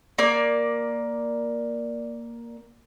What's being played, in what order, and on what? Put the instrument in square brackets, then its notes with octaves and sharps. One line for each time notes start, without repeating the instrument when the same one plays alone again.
[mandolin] A#3 D5